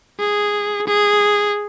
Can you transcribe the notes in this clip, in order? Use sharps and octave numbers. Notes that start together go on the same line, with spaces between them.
G#4
G#4